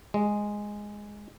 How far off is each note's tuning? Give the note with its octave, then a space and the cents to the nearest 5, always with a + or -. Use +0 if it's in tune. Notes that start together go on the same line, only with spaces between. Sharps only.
G#3 -5